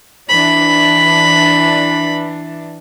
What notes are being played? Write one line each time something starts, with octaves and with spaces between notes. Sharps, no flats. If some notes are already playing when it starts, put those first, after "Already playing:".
E3 D4 B5